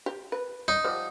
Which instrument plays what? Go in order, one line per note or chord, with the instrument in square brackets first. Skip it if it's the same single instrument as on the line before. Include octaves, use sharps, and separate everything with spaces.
[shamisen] G4
B4
[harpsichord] D#4
[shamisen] F3 G3 F#5